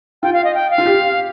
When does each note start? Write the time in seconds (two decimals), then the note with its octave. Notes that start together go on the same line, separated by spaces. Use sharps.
0.22 F4 G5
0.33 F5
0.44 D#5
0.54 G5
0.70 F5
0.78 F4
0.86 G4